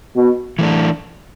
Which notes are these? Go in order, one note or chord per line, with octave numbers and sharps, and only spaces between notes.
B2
E3 A3 D4